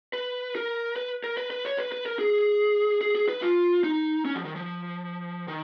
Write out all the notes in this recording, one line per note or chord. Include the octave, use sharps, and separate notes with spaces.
B4
A#4
B4
A#4
B4
B4
C#5
B4
B4
A#4
G#4
G#4
G#4
B4
F4
D#4
C#4
F3
D#3
F3
D#3